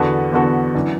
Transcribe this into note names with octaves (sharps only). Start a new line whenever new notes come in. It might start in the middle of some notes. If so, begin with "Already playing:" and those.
Already playing: E2 D3 B3 F#4 A4
E2 D3 B3 F#4 A4
F#2 E3 D4